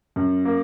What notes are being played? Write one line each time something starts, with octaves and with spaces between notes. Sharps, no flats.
F#2
A#3